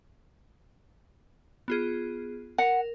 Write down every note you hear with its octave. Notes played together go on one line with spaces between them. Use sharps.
B3 F4 G#4
A#4 F#5